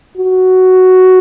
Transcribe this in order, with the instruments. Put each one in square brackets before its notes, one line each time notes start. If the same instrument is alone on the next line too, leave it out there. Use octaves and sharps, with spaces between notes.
[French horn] F#4